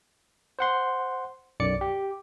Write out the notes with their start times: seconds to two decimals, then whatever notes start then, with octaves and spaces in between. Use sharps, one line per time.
0.59 C5 F#5 C6
1.60 B1 F#2 D5 D6 C#7
1.81 G4